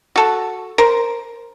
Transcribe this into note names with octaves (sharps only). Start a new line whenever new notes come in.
F#4 A4
A#4 C5